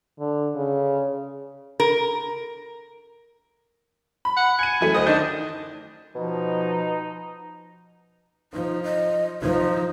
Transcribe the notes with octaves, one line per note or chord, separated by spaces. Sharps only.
D3
C#3
A#4
B5
F#5
G#5 C#7 D#7
F#2 E3 A3
D2 C5 D#5 D#6
D#3 D4 D#5 G6
B2 F3 D#4
F3 D#4
D#5
F3 D#4